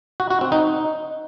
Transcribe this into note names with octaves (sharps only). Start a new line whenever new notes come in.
F#4
F#4
C4
D#4